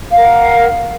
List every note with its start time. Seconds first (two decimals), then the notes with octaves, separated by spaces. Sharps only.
0.12 F5
0.17 A#4
0.22 F#5